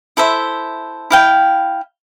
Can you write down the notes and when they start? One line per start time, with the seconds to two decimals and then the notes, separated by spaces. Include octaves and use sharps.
0.17 E4 A4 C5 E5
1.10 E4 F5 G5